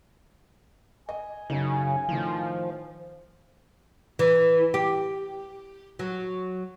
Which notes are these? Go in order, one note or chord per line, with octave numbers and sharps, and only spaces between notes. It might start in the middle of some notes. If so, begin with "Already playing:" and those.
D#5 G#5
F#2 C#3 D#4
A2 D#3 F3
E3
G4
F#3